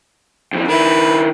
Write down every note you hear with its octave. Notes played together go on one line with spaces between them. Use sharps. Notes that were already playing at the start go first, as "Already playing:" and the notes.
F2 E3
D#3 E4 B4